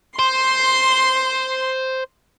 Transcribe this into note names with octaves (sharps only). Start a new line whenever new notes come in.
C5 C6